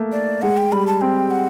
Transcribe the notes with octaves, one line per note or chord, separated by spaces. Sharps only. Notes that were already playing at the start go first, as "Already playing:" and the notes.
Already playing: A3 A#3
D5
G#3 F#5
G5
G3 B5
A5
C4 G5
F#5